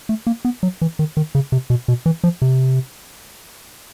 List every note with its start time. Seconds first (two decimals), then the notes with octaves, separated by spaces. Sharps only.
0.09 A3
0.27 A#3
0.45 B3
0.63 F#3
0.82 E3
0.99 D#3
1.17 D#3
1.35 C#3
1.52 C3
1.70 B2
1.88 B2
2.06 E3
2.24 F3
2.42 C3